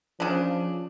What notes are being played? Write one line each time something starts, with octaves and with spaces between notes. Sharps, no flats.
C#3 F3 D4